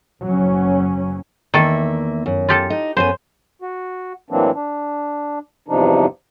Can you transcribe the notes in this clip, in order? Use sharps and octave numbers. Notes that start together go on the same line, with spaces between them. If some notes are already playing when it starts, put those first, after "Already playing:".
F#1 F#3 C#4
E2 D#3 A#3 A4 E5
F#2
F4 G4 A4
D#4
F#2 B3 C5 G#5
F#4
A2 E3 F#3 A#3 C4 D4
D4
E2 G2 C3 F3 D4 D#4